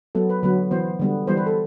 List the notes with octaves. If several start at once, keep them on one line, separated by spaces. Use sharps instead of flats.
F#3 B3 A4
B4
D3 F#3 B3 B4
E3 B3 C5
D3 G3 B3
E3 G3 B3 C5
B4
A4